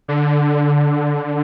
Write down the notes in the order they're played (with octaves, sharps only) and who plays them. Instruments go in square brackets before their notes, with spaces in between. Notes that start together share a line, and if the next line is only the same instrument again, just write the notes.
[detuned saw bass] D3